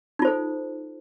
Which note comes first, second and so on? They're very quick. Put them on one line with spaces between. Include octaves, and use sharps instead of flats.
D#4 F4 C5 A4